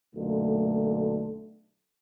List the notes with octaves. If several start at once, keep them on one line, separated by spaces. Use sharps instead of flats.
B1 F#2 A#2 D3 A3